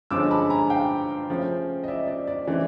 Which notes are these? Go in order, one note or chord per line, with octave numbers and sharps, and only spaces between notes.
G2 D3 F3 G#3 C#4 D6 E6
A5 B5
G#5 A#5
F5 G5
C#3 F3 A3 C#4
D#5
D5 E5
D5
D5
C#3 E3 A3 C4 D5